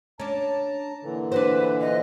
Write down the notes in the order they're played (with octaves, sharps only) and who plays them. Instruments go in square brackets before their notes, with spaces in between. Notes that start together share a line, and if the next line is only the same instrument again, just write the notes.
[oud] C#4 D4 [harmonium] A5 A#5
[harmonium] A#2 D3 E3
[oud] D4 F#4 C5 [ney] B4
[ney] D#5